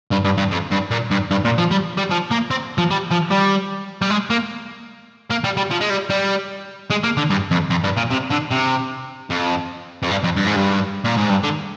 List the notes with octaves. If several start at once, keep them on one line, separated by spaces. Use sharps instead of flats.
G2
G2
G2
F2
G2
A#2
G2
G2
A#2
F3
G3
G3
F3
A#3
C4
F3
G3
F3
G3
G3
G#3
A#3
A#3
G3
G3
F3
G#3
G3
G3
G#3
A#3
D3
G2
F2
F2
G2
A#2
C3
D3
C3
F2
F2
G2
F2
G2
G#2
G2
A#2
G#2
G2
D3